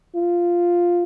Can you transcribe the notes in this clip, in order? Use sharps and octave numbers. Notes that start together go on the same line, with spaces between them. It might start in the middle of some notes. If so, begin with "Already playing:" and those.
F4